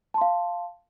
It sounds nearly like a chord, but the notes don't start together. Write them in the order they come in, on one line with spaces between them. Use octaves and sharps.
A5 C6 F5